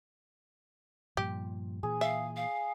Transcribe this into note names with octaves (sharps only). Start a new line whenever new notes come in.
G2 A#2 F3 G4
A#2 E3 G#4
E5 F5
F5